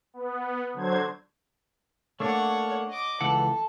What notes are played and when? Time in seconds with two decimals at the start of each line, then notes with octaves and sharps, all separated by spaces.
0.14 B3
0.74 D3 F#3 C5 G#6
2.20 A3 A#3 D4 C#5 F#5
2.89 D#5 D6
3.21 C#2 E3 A4 F#5